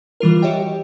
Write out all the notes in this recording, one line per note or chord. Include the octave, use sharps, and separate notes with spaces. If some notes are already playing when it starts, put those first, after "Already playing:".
E3 G3 F4 A#4
F#4 G4 C#5 D#5 E5 G5